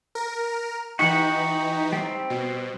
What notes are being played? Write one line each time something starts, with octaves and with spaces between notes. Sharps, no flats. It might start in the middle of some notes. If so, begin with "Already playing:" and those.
A#4
E3 D#4 F#4 G4 F#5
G3 C4
B2